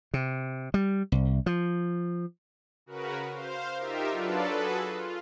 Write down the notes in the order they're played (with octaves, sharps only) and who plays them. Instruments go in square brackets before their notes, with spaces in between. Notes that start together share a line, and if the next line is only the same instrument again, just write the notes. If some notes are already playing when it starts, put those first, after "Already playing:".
[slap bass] C3
G3
C2
F3
[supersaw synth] C#3 F#4 A#4 B4
C5 F5
D#4 F4 G4 A#4 E5
F#3 D4 F4 A4 B4 D5
F#4 G#4 A4 B4
F4